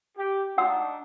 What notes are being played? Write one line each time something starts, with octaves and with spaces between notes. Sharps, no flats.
G4
D4 D#4 F#5 E6